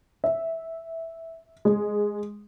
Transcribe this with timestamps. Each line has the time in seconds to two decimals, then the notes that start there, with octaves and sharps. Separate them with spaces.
0.24 E5
1.65 G#3